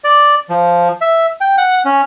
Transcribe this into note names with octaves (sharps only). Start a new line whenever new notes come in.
D5
F3
E5
G5
F#5
C#4